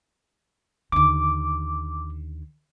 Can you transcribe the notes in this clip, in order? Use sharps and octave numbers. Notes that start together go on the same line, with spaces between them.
D#2 D3 D6